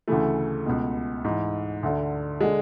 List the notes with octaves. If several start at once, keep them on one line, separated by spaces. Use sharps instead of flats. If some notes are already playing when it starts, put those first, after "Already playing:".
D2 C#3 E3 A3
C#2 B2
G#2 E3
D2 D3
D3 G#3